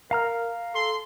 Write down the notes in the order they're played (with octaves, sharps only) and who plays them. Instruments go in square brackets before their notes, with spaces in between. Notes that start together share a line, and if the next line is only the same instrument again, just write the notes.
[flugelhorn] A#4 [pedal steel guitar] F5 A#5 F6
[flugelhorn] A4 [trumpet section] C6